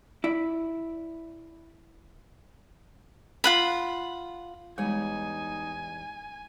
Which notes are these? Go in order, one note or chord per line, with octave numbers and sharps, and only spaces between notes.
E4 D5
F4 F#5 B5
E2 G3 G#3 D#4 C#5 G#5